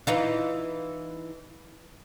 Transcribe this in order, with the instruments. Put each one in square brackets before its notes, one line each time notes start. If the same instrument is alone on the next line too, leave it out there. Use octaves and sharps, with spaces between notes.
[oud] E3 D#4 F4